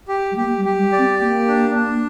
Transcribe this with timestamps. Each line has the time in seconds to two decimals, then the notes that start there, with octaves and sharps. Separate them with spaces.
0.08 G4
0.31 G3
0.36 A#3 G4
0.58 G3
0.65 G4
0.79 G3
0.92 D5
0.98 C4
1.19 A#3 G4
1.48 D4
1.75 D4